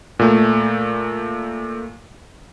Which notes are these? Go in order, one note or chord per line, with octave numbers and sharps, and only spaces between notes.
A#2 A3